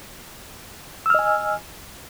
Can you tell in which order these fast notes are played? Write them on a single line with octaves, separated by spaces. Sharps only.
E6 F6 D#5 G#5